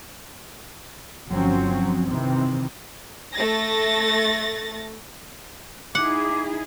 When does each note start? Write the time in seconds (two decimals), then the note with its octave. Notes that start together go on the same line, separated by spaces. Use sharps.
1.28 G1 F3 F#3 C4 C#4
2.09 C3 D#3 E3 C4
3.34 A3 A6 A#6
5.95 D#4 E4 G#4 F#5 D6